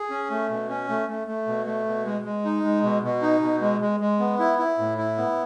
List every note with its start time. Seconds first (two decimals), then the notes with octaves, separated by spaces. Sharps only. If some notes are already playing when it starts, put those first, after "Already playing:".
Already playing: G#4
0.10 C#4
0.30 A3
0.50 B2
0.69 C#4
0.89 A3
1.09 A3
1.27 A3
1.47 B2
1.66 A3
1.86 B2
2.05 G#3
2.25 G#3
2.45 D#4
2.64 G#3
2.83 B2
3.03 B2
3.22 D#4
3.42 B2
3.61 G#3
3.81 G#3
4.00 G#3
4.19 B3
4.39 E4
4.59 E4
4.78 A2
4.98 E4
5.18 B3